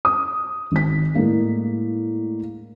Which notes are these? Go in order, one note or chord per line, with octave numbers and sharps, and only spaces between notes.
D#6
G#1 B6
A2 G#3 A#3 D4